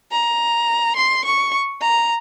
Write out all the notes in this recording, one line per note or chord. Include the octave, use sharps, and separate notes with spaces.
A#5
C6
C#6
A#5